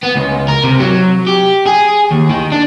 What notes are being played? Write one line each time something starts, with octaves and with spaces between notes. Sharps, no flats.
B3
C#2
A#4
C3
F#3
G4
G#4
D#2
D#3
D4